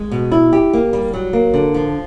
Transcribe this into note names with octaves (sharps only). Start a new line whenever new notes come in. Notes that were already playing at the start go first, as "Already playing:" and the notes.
Already playing: G#3
B2
E4
G4
A#3
G3
F#3
A#3
D3
F3